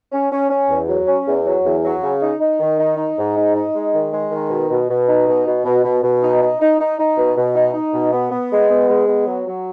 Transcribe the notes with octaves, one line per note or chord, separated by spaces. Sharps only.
C#4
C#4
C#4
E2
F#3
C#4
E2
F#3
E2
F#3
C#3
D#4
D#4
D#3
D#4
D#4
G#2
D#4
D#4
G#3
D#3
G#3
D#3
B2
B2
B2
D#4
B2
B2
B2
B2
B2
D#4
D#4
D#4
D#4
D#4
B2
B2
D#4
D#4
B2
B3
B3
G#3
B3
G#3
B3
F#3
F#3